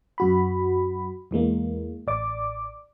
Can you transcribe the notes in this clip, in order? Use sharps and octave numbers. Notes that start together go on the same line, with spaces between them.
F#2 F#4 B5
E2 E3 G#3 A#3
A1 D5 D6